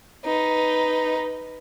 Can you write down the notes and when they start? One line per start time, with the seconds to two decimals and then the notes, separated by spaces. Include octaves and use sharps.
0.25 D#4 B4